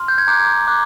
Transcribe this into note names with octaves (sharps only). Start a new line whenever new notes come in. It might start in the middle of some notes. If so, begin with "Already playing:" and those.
Already playing: C6 F6
G6
G#6
A#5 D6 F#6 G6
A#5 D6 F#6